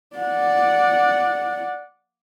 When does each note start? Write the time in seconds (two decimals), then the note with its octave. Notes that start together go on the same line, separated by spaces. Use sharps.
0.16 D5 F#5